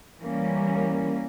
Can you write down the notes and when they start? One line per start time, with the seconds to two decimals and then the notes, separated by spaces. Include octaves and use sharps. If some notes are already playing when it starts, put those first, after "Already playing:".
0.20 E3 G3 A#3 C#4